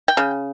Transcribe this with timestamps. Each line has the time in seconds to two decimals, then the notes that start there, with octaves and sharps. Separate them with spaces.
0.08 G5
0.17 C#3